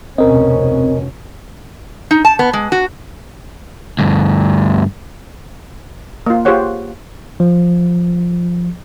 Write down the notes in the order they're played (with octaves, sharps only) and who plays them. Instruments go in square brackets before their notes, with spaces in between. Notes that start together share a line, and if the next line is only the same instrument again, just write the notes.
[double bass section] F1 B2 C#4 [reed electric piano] D2 A#4 D#5 [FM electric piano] C4
[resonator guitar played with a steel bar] D#4
A5
B3
G#3
F#4
[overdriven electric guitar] D2 G2
[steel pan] A#3 F4
F4 G4 G#4 C5 C#5 F#5
[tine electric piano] F3